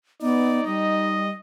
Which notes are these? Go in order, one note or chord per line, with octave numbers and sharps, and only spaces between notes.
B3 D#4 D5
G3 D#5